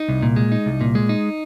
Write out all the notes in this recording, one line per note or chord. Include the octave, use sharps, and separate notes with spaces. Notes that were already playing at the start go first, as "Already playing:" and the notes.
Already playing: D#4
C2
A#2
G#3
D#4
C2
A#2
G#3
D#4